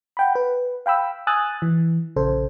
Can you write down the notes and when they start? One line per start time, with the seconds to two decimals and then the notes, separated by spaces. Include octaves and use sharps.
0.17 F#5 G5 B5
0.35 B4
0.86 F5 G5 B5 E6
1.27 G#5 D#6 E6 F#6 A6
1.62 E3
2.16 A#1 C#3 A4 C5